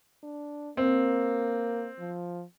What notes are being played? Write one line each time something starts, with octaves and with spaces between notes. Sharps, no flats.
D4
A#3 C4
F3